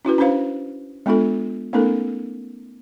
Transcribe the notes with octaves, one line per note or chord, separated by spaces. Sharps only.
C#4 E4 F#4 B4
C#4 D4 B4 C5 F5
G#3 B3 D4 F4 A4
A3 B3 C#4 D#4 A4 A#4